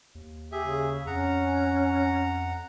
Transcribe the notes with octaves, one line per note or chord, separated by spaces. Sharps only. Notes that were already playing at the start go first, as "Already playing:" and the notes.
D#2
G4 G#4 E5
C#3
F2 C#4 F#5 A#5